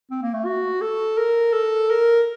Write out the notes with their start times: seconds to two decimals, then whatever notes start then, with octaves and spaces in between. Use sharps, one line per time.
0.11 C4
0.23 A#3
0.34 A3
0.46 F#4
0.81 A4
1.17 A#4
1.53 A4
1.90 A#4